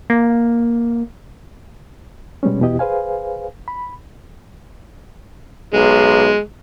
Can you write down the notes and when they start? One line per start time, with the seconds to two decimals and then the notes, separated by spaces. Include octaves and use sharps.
0.10 A#3
2.43 B2 G3 G#3 B3 C#4
2.61 E2 B2 E4 G4 D#5
2.79 G#4 B4 C5 F5 G#5
3.68 B5
5.73 B1 G#3